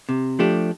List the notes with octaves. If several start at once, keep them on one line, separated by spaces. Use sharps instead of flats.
C3
F3 A3 D4 G4